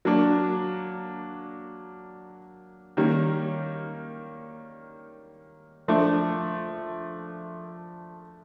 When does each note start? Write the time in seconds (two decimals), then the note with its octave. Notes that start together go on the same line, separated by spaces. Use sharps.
0.05 F#3 A#3 D4
2.97 D#3 G3 A#3 C#4
5.88 F3 A3 D4